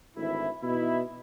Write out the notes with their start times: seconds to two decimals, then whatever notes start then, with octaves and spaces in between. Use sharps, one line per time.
0.17 G#1 D2 E3 E4
0.63 B2 E3 D#4 E4